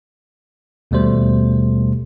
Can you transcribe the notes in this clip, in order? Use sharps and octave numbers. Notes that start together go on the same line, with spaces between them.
D#2 B2 G3 A3 C5